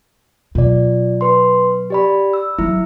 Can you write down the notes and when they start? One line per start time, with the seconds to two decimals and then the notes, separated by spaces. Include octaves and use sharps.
0.55 B2 F#3 F4 D5
1.21 B4 C6
1.90 G4 D5 B5
2.33 E6
2.59 F#3 E4